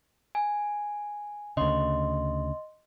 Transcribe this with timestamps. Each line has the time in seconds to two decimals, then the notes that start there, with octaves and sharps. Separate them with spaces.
0.35 G#5
1.57 D2 C#3 D#5 C6